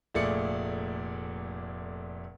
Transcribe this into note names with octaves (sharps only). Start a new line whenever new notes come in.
F1 A#2 A3 G#4 D5 C#7